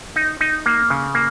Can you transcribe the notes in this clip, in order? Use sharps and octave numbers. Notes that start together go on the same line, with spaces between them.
D#4
D#4
A#3
C#3
A#3